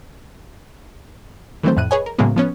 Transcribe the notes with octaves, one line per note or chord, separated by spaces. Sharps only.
D#3 E3 F#3 A3 C4 C5
F2 A2 F#6 D#7
G#4 B4 C#5 D#5 G#5
A#4
A2 C#3 F#3 G#3 A#3 B3
F3 B3 C#4